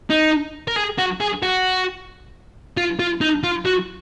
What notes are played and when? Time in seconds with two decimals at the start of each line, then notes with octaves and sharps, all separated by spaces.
0.10 D#4
0.68 A#4
0.76 G#4
0.99 F#4
1.21 G#4
1.43 F#4
2.77 F4
3.00 F4
3.21 D#4
3.44 F4
3.65 F#4